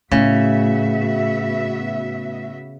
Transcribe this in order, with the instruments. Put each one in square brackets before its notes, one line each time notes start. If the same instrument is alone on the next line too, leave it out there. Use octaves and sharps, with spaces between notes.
[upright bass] A2 [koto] C#3 [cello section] B3 F#4 E5